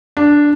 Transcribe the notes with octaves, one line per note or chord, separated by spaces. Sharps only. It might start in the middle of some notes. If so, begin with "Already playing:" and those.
D4